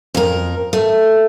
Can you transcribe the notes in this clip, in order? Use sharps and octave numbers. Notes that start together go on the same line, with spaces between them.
F2 A#4
A3